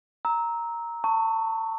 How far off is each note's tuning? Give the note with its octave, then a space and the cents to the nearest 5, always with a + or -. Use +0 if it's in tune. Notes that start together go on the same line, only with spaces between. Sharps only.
A#5 +0 E6 -25
A5 +30 C#6 +0